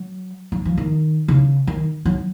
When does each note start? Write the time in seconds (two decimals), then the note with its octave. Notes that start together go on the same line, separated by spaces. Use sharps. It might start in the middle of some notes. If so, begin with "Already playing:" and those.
Already playing: F#3
0.52 F#3
0.65 F3
0.77 D#3
1.28 C#3
1.67 D#3
2.05 F#3